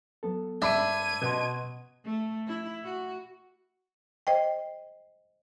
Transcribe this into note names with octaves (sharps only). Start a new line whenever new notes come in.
F#3 B3 A4
G2 G#3 D4 E5 B5 G#6 D#7
B2 D#5 F#5 C6
A3
E4
F#4
C5 D#5 G5